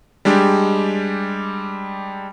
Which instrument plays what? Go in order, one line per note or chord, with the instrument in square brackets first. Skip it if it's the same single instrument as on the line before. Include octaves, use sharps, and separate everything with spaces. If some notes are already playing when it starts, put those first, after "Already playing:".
[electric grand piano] G3 G#3 D4 G4